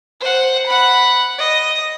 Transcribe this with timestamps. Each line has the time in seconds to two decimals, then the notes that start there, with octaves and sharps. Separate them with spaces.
0.20 C5 F#5
0.66 F#5 B5
1.38 D#5